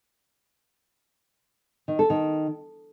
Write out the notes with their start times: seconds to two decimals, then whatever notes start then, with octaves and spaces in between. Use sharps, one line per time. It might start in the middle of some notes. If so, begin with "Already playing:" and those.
1.88 D#3
1.99 A4
2.10 D#3